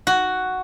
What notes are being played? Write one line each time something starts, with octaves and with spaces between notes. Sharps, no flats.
F#4